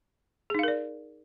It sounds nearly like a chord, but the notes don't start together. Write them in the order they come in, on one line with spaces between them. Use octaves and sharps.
G#4 D#4 F5 A#4 D5